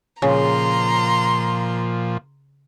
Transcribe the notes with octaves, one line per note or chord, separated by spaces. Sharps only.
A#2 C#3 F3 A#5 C6